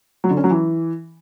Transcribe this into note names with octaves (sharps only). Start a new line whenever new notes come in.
F#3
D3
C#4
F#3
E3